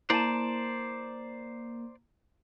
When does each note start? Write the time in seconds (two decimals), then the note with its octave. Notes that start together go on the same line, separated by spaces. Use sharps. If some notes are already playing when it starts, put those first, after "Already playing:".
0.10 A#3 E4 C5 D5 A5 A#5 E7